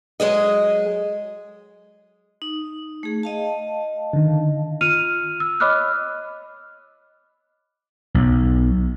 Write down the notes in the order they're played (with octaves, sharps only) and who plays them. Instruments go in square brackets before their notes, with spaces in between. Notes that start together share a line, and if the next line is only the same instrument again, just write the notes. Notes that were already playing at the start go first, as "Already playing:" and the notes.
[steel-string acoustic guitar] F#3 G#3 G#4 D#5
[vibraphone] D#4
A3 G#4
D#5 F5 A5
[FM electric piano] D3 D#3
[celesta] F4 F6 C#7 D#7 F7
E6
C#5 D#5 B5 D6 F6 F#6
[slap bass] B1